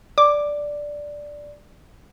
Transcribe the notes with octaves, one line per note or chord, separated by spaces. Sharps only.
D5 D6